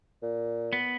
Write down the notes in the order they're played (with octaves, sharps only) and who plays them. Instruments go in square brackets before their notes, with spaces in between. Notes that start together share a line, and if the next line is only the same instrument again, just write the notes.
[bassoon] A#2
[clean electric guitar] B3